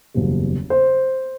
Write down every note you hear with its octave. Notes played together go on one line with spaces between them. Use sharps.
F#1 E2 B2 G3
C5